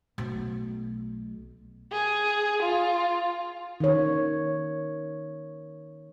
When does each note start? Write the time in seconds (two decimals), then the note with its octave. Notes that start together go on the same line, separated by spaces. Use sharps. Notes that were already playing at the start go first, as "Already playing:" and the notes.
0.18 B1 A3
1.92 G#4
2.62 F4
3.80 D#3 C#5